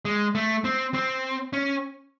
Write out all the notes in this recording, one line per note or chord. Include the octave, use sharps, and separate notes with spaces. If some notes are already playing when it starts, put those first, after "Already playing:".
G#3
A3
C4
C4
C#4